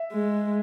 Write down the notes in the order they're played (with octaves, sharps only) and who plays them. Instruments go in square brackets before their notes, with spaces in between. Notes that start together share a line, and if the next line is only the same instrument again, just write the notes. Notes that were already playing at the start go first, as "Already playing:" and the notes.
Already playing: [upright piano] E5
[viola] G#3